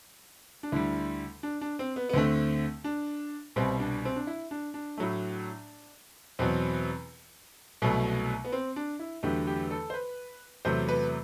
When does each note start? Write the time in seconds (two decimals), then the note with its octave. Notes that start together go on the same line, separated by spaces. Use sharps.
0.63 D4
0.72 D2 D3 G3 E4
1.43 D4
1.61 D4
1.79 C4
1.96 B3
2.09 B3
2.13 D2 D3 A3 C4
2.84 D4
3.56 C2 B2 G3 C4
3.80 D4
4.05 C4
4.16 D4
4.27 E4
4.51 D4
4.74 D4
4.98 A2 F#3 A3
6.39 E2 B2 F#3 C4
7.82 C2 B2 F#3 A3
8.45 B3
8.52 C4
8.76 D4
8.99 E4
9.23 E2 D3 F#3 A3 G4
9.47 G4
9.71 A4
9.90 C5
9.94 B4
10.65 E2 C3 F#3 A3 C5
10.89 B4